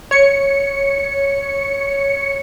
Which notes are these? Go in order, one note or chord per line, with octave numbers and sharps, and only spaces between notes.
C#5 C#7